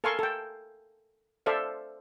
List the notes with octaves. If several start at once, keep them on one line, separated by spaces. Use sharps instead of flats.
A4 A#4 F5 G#5 C6 C#6
A4 G5
A4 C5 D5 E5 F5